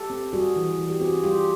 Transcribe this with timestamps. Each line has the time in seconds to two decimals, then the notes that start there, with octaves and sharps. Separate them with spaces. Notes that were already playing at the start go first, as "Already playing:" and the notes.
Already playing: G4 A4
0.10 C4
0.33 G3 F#4 G#4
0.56 E3
0.79 E3
0.90 G4
1.01 C4 F#4 G#4
1.23 G3 F4 G4